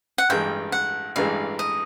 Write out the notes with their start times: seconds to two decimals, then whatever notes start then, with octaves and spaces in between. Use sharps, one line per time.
0.18 F#5
0.29 A1 G2 E3 G#3 G5
0.72 F#5
1.16 A1 G2 E3 G#3 F5
1.59 D#5